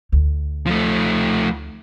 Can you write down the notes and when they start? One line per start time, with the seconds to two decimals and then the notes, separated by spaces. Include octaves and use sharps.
0.12 D2
0.66 F3 A3